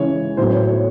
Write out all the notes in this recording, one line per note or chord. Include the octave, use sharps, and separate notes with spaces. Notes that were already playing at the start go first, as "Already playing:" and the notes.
Already playing: C#3 E3 G#3 C#5
A2 F#3 B3 C5
C#5
C#5